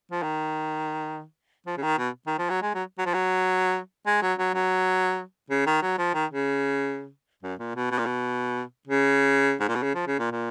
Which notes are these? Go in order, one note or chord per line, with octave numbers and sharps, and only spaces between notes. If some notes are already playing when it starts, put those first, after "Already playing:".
F3
D#3
F3
C#3
D#3
B2
D#3
F3
F#3
G#3
F#3
F#3
F3
F#3
G#3
F#3
F#3
F#3
C#3
D#3
F#3
F3
D#3
C#3
F#2
A#2
B2
B2
A#2
B2
C#3
G#2
A#2
B2
C#3
F3
C#3
A#2
A#2